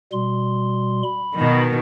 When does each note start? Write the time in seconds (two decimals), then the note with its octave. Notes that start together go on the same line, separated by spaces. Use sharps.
0.12 B2 G3 C6
1.04 B5
1.36 B2 D#3